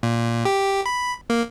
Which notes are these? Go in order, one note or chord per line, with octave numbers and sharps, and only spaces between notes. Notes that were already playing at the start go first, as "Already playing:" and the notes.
A#2
G4
B5
A#3